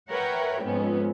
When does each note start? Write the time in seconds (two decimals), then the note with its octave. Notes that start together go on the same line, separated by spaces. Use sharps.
0.10 A#4 B4 C#5 E5 F#5 G5
0.63 F2 G#2 G#3 B3 C#4